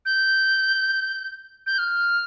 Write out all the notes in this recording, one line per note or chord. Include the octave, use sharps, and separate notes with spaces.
G6
G6
F6